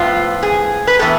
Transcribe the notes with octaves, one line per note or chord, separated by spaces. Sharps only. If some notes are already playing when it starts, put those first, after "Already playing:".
Already playing: A2 F3 B3 F4
G#4
B4
A2 E3 B3 A4